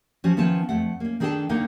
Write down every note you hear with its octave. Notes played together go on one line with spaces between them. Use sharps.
F3 C#4 F#4
D#3 F3 B3 C#4 E4 A5
F2 A3 F#5
A#3 C#4
D#3 D4 G#4 A4 G5 A5
D3 A#3 D#4 A#4 F#5 G5